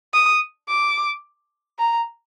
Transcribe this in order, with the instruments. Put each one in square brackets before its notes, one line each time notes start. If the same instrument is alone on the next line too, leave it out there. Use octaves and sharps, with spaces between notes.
[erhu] D#6
D6
A#5